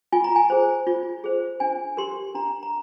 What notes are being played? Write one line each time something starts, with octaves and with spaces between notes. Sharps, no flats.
F4 G#5
A#5
G#5
G#4 C5
F4
G#4 C5
D4 G#5
G4 A#4 C6
D4 A#5
A#5